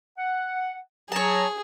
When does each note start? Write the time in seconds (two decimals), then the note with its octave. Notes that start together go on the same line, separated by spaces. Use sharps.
0.18 F#5
1.12 F#3 G#4 C#5 A5 A#5